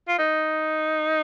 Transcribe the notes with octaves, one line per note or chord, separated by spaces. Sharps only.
F4
D#4